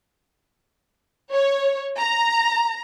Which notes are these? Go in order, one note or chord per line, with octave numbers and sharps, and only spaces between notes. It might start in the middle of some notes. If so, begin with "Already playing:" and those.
C#5
A#5